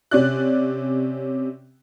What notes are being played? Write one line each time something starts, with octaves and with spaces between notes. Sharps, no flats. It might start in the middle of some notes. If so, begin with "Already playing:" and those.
C3 C#4 D5 F#6